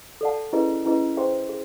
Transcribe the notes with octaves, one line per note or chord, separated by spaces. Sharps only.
A4 D5 F#5 A5
C#4 E4 G#4 B4 D#5
C#4 E4 G#4 B4 D#5
G#4 C5 E5 G5 C6
G#4